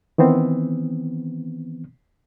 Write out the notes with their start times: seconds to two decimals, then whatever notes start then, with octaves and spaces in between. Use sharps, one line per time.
0.18 D#3 E3 B3 C4